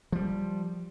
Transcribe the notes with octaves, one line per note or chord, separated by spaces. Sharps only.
F3 G3